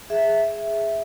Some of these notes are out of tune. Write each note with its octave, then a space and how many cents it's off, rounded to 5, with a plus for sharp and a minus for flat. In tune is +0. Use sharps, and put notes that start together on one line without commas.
G#4 +0 E5 +0